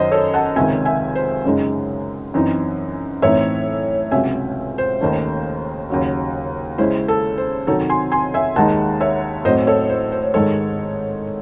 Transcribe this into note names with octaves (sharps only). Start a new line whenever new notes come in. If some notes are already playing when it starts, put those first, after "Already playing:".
Already playing: F#2 D#3 F#3 C5 D#5
A4 C#5
F#5 A5
C#2 C3 D#3 E5 G#5
E5 G#5
C5
F#2 C#3 G#3 D#4
F#2 E3 C4 D#4
A2 E3 C4 D#4 C#5 E5
C#2 C3 F#3 C#4 E5 G#5
C5
D#2 D#3 A3 C#4
D#2 C#3 F#3
C#3 G#3 C#4 E4 C5
A4
C5
C3 D#3 F#3 C4 D#4 A4 C#5
G#5 C6
G#5 C6
E5 G#5
D#2 D#3 G#3 D#4 F#5 A5
C#5 E5
A2 F#3 C4 C5 D#5
A4 C#5
C5
C5
G#2 D#3 G#3 A4 C#5